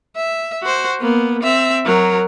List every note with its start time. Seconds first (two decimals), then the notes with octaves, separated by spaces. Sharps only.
0.16 E5
0.63 F#4 C5
1.00 A#3 B3
1.43 C4 E5
1.85 F#3 A#4